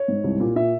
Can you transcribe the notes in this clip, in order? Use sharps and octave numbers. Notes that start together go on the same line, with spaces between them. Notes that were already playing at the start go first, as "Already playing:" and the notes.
Already playing: C#5
G#2
C2
A#2
A#2 E5